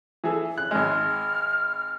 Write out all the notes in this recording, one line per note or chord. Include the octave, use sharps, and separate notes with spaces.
E3 G#4 A4
F#6
G#1 G#3 F6